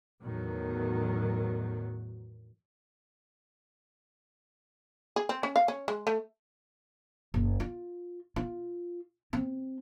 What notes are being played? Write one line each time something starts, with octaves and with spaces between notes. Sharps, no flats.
E2 A2 D#3 F#3
G#4
C4
C#4
F5
C#4
G#3
A3
F#1
F4
F4
C4